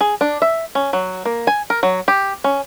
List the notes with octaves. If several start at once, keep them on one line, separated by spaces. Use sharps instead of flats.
G#4
D4
E5
C#4
F#3
A#3
G#5
A#4
F#3
G4
C#4